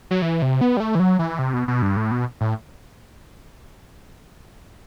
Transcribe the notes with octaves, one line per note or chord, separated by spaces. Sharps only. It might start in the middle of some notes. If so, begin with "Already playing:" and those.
F#3
E3
C3
B3
G3
A3
E3
F#3
E3
C3
B2
B2
G2
A2
B2
A2